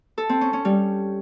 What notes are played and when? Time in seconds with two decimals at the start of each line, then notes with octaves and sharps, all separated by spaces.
0.18 A4
0.29 C4
0.41 C#4
0.53 C#4
0.65 G3